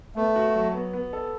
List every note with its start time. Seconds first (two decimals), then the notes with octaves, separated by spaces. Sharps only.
0.16 A3 B3
0.36 F#4
0.55 F#3
0.74 B3
0.94 B3
1.13 A4